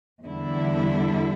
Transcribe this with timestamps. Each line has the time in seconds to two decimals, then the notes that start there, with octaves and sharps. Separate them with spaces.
0.22 E2 D3 G3 E4